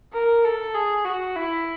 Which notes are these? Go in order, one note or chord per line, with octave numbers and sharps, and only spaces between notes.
A#4
A4
G#4
F#4
E4